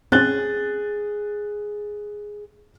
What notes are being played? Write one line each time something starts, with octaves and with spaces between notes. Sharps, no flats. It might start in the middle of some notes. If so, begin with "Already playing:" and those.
C4 C#4 G#4 F#6 A6 G7